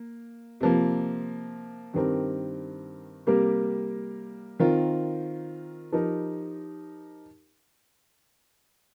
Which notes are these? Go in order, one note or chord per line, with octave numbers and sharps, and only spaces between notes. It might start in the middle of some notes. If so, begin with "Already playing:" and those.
Already playing: A#3
C3 F3 A#3
G2 D#3 C4 G4 A#4
C3 G3 A#3 G4 A#4
D#3 C4 F4 A#4
F3 D#4 G4 A#4